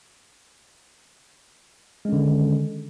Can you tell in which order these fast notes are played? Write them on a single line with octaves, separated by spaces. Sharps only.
G#3 C#4 D3 D#3